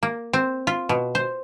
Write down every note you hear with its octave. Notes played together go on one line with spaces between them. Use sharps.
A#3
C4
F4
B2
C5